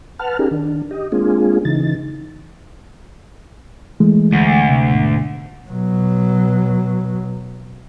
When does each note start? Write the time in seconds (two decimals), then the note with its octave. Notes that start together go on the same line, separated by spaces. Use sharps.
0.19 B4 F#5 A5 F6
0.39 C#4 D#4 G4 G#4 A#4
0.51 D#3 D4
0.91 G4 D#5
1.12 G#3 A#3 C4 D4 F4 G#4
1.65 C#3 E3 D#4 A6
4.00 E3 G#3 A3
4.32 D2
4.69 C3
4.89 G#2 B2
5.70 B2 F#3